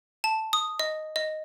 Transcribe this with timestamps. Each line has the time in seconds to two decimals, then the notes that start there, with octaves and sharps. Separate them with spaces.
0.24 A5
0.53 D#6
0.80 D#5
1.16 D#5